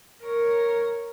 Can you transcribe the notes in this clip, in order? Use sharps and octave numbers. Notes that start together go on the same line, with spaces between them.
A#4 C#5